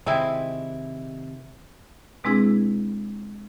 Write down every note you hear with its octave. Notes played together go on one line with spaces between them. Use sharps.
C3 D#3 G#3 C4 E4
B2 G#3 C4 D4 E4 G#4